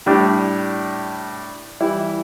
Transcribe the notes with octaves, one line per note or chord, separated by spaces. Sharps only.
A2 G3 D4
E3 G3 E4